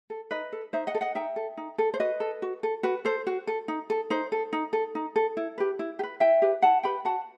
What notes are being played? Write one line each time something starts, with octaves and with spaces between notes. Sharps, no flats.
A4
D#4 B4 D#5
A4
D#4 C5 E5
D#5 F#5
A4
D#5 F#5
D#4 E5 G5
A4
D#4
A4
C5
F#4 B4 D#5
A4
F#4
A4
F#4 B4
A4 C5
F#4
A4
D#4
A4
D#4 C5
A4
D#4
A4
D#4
A4
E4
G4 B4
E4
G4
B4
E4 E5 G5
G4 B4
E4 F#5 A5
G4 B4 G5 B5
F#4 F#5 A5